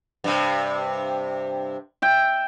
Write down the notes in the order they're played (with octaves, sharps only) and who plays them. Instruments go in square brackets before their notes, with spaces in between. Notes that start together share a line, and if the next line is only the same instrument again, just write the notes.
[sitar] G2 C3
[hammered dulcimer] E5 G5